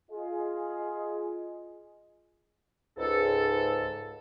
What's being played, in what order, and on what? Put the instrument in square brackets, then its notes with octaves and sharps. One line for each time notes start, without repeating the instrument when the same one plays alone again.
[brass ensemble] F4 G#4 D#5
[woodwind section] C#2 G#2 A4